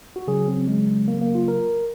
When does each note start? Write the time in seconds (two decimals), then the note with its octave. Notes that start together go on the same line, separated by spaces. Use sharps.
0.16 F#4
0.28 C#3 F#3 G#4
0.48 C4
0.68 G#3
1.08 A#3
1.21 A#3
1.35 F4
1.48 A#4